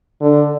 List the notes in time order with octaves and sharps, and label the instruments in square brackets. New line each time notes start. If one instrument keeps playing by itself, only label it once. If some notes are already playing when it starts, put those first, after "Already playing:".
[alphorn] D3